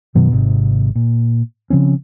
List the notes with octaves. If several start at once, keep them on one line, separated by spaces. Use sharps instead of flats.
F#2 B2 D#3 F#3
G#1 G#2 C3
A#2
C#3 F3 C4 C#4